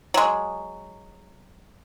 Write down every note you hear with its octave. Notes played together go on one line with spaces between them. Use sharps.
F#3 G#3